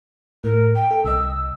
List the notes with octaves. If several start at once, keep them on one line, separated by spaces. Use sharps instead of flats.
A2 A#4
G5
A4
C2 D#5 E6